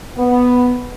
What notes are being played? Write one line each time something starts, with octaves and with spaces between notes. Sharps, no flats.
B3